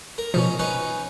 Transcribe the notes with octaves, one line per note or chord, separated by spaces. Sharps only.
A#4
B2 F3 C#4 D#4
C#4 D#4 B4